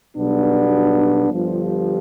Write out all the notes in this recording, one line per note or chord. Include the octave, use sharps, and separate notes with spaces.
B1 B2 G3 B3 D4
G1 G2 F3